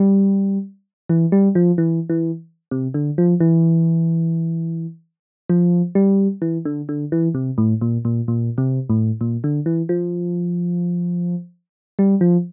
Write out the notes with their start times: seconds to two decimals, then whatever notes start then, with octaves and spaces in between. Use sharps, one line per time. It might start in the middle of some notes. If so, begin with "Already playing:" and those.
Already playing: G3
1.10 E3
1.32 G3
1.55 F3
1.78 E3
2.10 E3
2.71 C3
2.94 D3
3.18 F3
3.40 E3
5.50 F3
5.95 G3
6.42 E3
6.65 D3
6.89 D3
7.12 E3
7.35 C3
7.58 A2
7.81 A#2
8.05 A#2
8.28 A#2
8.58 C3
8.90 A2
9.21 A#2
9.44 D3
9.66 E3
9.89 F3
11.99 G3
12.21 F3